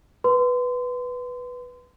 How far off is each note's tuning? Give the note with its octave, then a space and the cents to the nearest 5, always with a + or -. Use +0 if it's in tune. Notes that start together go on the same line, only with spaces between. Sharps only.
B4 +0 C6 -30